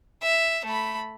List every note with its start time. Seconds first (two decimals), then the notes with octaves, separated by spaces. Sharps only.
0.23 E5
0.65 A3 B5